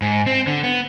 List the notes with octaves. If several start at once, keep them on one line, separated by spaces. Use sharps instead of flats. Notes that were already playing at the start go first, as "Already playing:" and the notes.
G#2
C4
D3
B3